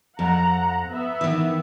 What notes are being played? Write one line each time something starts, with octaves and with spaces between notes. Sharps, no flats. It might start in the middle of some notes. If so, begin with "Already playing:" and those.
F2 F#5 A#5
B3 E5
D#3 E3